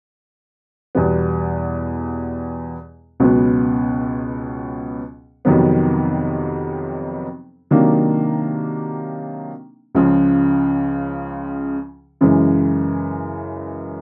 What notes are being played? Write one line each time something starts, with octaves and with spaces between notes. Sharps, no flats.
E2 B2 G3 B3
C#2 B2 F#3 B3
F2 C3 D#3 F#3 B3
C3 D#3 F#3 A#3 D4
C#2 C#3 F3
F#2 C#3 E3 G#3